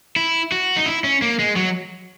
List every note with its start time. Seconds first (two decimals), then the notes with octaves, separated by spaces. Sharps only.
0.16 E4
0.52 F#4
0.77 D#4
0.86 E4
1.04 C#4
1.22 A#3
1.39 G#3
1.56 F#3